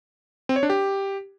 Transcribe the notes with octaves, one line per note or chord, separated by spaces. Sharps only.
C4
C#5
D4
G4